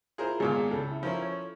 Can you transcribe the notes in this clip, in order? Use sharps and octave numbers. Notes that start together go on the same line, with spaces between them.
E4 F4 G#4 A#4 C5
G#1 A#2 G#3 B3 F4 G#4
C#2 A4
E4
F3 C#4 E4 F4 A#4 C5
C#5